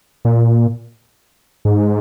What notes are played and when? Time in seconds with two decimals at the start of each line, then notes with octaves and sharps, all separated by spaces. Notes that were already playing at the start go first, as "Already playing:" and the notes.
0.25 A#2
1.65 G#2